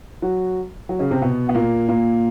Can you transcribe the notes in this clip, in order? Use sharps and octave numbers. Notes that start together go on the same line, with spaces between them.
F#3 F#4
F#3 F#4
C#3 C#4
C3 C4
B2 B3
B3
A#2 A#3
A#2 A#3